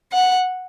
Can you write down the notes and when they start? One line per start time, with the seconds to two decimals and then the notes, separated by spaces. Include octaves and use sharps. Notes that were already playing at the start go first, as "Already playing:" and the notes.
0.13 F#5